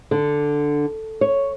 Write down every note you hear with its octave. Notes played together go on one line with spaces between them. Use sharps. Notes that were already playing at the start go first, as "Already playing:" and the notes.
D3
C#5